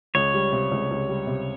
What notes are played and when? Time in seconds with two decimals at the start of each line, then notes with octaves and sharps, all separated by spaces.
0.15 C#2 C#5
0.34 G3
0.52 C3
0.72 C#2
0.90 C#2
1.09 G3
1.27 C3